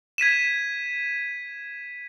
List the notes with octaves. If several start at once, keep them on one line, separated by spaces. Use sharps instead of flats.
G#6 B6 D#7 E7